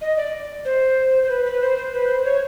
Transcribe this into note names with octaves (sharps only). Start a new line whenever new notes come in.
D#5
D5
C5
C5
B4
B4
C5
C5
B4
C5
C#5